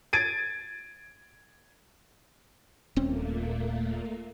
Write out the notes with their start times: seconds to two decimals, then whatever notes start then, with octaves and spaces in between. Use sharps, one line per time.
0.13 G#6 A6 D7 D#7
2.96 D#1 A#2 A3 A#3 C4 C#4